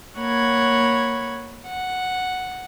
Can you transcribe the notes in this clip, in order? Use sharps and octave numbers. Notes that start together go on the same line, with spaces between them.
A#3 C#5 F#5 B5 G#6
F#5